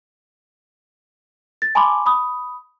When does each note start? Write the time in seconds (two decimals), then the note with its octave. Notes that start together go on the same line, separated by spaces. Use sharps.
1.62 A6
1.75 G#5 A5 B5 C6 D6
2.06 B5 D#6